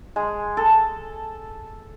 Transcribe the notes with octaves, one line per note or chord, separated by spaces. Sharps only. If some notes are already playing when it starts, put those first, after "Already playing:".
G#3
A4